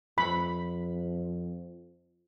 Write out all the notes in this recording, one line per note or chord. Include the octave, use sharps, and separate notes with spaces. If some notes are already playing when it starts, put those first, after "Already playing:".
F2 B5